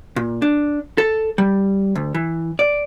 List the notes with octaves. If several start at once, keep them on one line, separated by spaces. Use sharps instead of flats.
A#2
D4
A4
G3
D2
E3
D5